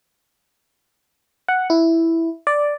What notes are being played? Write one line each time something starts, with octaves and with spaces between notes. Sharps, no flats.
F#5
E4
D5